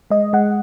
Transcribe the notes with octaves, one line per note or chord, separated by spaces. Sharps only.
G#3 D#5
G#3 F#5